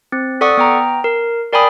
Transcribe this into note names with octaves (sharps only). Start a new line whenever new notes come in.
C4
A4 D5 F#5 C#6 D#6
B3 G5 A#5
A#4
A#4 D5 G5 G#5 B5 D#6